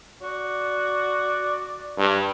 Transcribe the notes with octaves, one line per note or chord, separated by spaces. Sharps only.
F#4 D5
G2